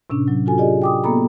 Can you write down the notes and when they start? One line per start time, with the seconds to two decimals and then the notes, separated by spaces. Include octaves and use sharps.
0.10 A2 C3 C#4 D4
0.28 F#3
0.46 F4 F#4 A4 G#5
0.58 F4 G4 G#4 D5 D#5
0.82 G5 D6 D#6
1.04 A#3 B3 A4 A#5 B5